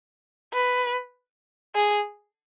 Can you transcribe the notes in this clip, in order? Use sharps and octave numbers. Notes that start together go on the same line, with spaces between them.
B4
G#4